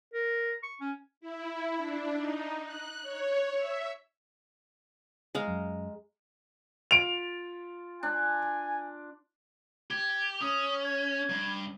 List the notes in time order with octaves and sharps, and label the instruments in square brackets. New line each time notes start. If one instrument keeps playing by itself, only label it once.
[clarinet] A#4
C#6
C#4
[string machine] E4
D4
D#4
F#6
C#5
E5
[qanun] G#3 F5 A#5
[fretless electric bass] F#2
[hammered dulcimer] F4 [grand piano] D7 F7
[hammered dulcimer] D4 [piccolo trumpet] G#5
[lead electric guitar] G4 [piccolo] G#6
[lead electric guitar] C#4 [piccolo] D#6
[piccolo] G#6
[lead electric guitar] G2